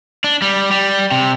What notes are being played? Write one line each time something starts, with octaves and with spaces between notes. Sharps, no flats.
D4
G3
G3
C3